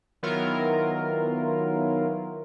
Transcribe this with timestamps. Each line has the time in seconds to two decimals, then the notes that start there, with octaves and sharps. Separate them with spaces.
0.23 D#3 F#3 B3 E4 F4 A#4